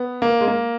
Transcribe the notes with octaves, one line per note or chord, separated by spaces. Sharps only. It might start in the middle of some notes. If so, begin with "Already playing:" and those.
Already playing: B3
A#3
G#3
A#3